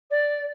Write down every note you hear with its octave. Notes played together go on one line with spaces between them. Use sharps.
D5